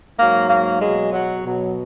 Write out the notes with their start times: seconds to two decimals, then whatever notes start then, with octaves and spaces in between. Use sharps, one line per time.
0.19 G#2 F#3 A#3
0.50 A#3
0.82 B2 F#3 G#3
1.13 F#3
1.44 B2 F#3